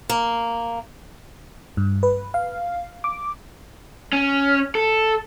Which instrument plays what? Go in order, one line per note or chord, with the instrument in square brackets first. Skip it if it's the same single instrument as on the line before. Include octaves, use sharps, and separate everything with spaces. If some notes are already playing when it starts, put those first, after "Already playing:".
[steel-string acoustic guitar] A#3
[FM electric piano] G2
B4
F5
D6
[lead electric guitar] C#4
A4